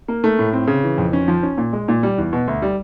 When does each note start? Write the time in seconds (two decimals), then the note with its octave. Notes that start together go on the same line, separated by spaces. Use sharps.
0.08 A#3
0.24 A3
0.39 A2
0.53 C4
0.67 C#3
0.84 E3
0.98 F2
1.13 C#4
1.28 F3
1.43 C#4
1.58 A#2
1.73 G#3
1.88 A#2
2.03 G3
2.18 E2
2.33 B2
2.48 D2
2.62 G3